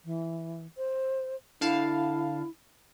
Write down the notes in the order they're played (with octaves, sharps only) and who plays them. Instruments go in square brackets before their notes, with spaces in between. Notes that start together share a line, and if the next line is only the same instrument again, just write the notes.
[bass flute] E3
C5
[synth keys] D3 F5 A5 [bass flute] E4